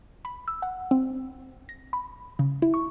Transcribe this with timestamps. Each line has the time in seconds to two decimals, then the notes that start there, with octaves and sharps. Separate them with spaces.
0.25 B5
0.48 E6
0.62 F#5
0.91 C4
1.69 A#6
1.93 B5
2.39 C#3
2.62 E4
2.74 C#6